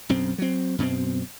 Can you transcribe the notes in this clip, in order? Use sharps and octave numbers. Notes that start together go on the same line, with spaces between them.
B1 F#2 C4
F#3 C4
F#2 B2 B3 C4